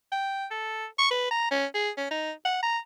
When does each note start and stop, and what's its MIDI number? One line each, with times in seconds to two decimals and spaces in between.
0.12 0.45 79
0.51 0.85 69
0.98 1.08 85
1.10 1.29 71
1.31 1.50 82
1.51 1.66 61
1.74 1.90 68
1.97 2.08 61
2.11 2.31 63
2.45 2.62 78
2.63 2.78 82